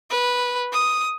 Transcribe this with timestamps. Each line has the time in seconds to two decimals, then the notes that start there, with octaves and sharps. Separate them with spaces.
0.10 B4
0.73 D#6